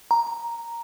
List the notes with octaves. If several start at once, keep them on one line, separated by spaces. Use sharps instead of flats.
A#5